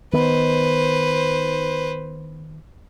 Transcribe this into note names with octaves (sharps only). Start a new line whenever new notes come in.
D#3 B3 B4 C5